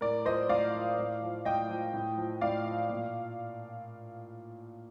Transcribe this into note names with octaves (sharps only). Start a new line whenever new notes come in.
A2 A#4 D5
F3 C5 D#5
A2 D5 F5
F3
A2
F3
A2 D#5 G5
F3
A2
F3
A2 D5 F5
F3
A#2